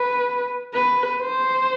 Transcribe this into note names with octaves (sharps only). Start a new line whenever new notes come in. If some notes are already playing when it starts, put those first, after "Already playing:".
Already playing: B4
B4
C5